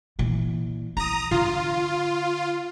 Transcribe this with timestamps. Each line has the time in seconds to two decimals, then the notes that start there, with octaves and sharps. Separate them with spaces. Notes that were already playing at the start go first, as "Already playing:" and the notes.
0.19 A#2 E3
0.97 E4 A#5 D#6
1.31 D3 F4